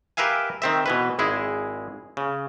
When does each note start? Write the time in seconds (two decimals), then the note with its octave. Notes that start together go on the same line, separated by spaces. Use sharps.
0.17 G4 A#4 B4 E5 F5 G#5
0.62 D#3 C4 E5
0.86 B2 E3 B4
1.19 G#1 G#3 E4 G#4
2.17 C#3